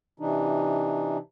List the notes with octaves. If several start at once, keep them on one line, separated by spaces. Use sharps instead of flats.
C3 E3 D4 D#4